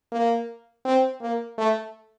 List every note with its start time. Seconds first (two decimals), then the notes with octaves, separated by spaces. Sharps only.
0.12 A#3
0.85 C4
1.22 A#3
1.58 A3